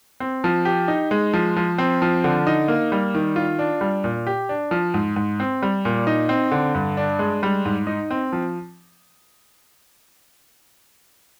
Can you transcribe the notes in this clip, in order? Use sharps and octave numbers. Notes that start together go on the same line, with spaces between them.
C4
F3
G4
D#4
G#3
F3
F3
C4
F3
D3
D#4
A#3
G3
D#3
F4
D4
G3
A#2
G4
D4
F3
G#2
G#2
C4
G3
A#2
D#4
C4
D3
G2
D4
G#3
G3
G#2
D#4
C4
F3